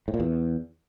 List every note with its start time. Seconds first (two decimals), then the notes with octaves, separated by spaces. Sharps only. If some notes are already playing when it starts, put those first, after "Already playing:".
0.08 A2
0.14 A#2
0.20 E2